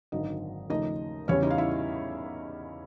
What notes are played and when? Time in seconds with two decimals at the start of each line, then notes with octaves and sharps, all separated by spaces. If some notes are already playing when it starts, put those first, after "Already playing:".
0.12 G#1 F#2 D3 D#4 D#5
0.70 D#2 C#3 F3 A3 D#4 D#5
1.28 E2 C#3 E3 G3 C#4 C#5
1.43 D#4 D#5
1.51 F5
1.58 E4 E5